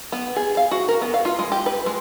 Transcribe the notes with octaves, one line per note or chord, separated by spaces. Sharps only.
B3
G#4
F5
F#4
A#4
B3
F5
F4
G#3
G4
B4
G#3